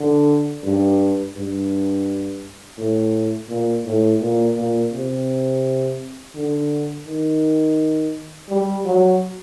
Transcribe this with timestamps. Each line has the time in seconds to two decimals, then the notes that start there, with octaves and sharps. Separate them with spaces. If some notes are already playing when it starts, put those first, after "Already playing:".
Already playing: D3
0.63 G2
1.35 G2
2.78 A2
3.49 A#2
3.85 A2
4.21 A#2
4.56 A#2
4.92 C3
6.35 D3
7.07 D#3
8.49 G3
8.85 F#3